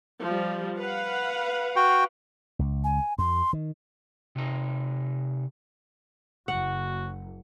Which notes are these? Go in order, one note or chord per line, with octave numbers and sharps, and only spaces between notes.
F3 G3
B4 F5 F#5
F#4 G5
C#2
G#5
F2 C6
D#3
C3 D#4
F#1 F#4 F#5